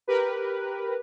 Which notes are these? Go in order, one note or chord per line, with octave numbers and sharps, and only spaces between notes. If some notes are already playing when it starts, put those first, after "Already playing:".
G4 A#4 B4